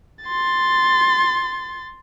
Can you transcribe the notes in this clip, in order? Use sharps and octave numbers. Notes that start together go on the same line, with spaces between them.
C6 A6